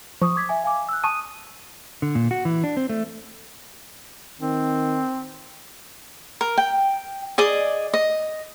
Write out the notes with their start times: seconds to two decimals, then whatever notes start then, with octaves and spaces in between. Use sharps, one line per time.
0.22 F3 C#6 D#6
0.36 D6 G#6 B6
0.49 E5 G#5
0.64 F5 G#5 D6
0.89 E6 F#6
1.04 G#5 A5 C#6 D#6 D#7
2.02 D3
2.15 A#2
2.31 F#4
2.45 E3
2.64 D4
2.77 C4
2.89 A3
4.41 D#3 C4
6.41 A#4
6.58 G5
7.38 G#4 D5 D#5 D#6
7.94 D#5